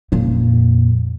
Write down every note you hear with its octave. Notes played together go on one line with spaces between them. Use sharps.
F2 A#2